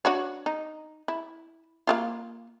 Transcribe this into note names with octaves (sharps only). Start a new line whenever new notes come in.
D4 F#4 C#5
D#4
E4
A#3 E4 F4